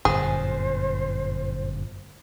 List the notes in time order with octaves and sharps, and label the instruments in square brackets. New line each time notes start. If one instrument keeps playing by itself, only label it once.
[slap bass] G1 F#2 A#2 [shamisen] G#4 [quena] C5